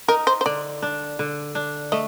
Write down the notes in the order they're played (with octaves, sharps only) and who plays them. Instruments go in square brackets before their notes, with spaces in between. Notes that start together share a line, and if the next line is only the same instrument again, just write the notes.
[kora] D#4 [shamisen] A#4
[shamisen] C5
C5
[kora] D3 [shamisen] D5
[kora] D4
D3
D4
[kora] A3 [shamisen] D#5